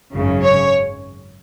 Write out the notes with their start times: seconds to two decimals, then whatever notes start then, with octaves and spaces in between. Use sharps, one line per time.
0.13 G#1 F#2 C#3
0.43 C#5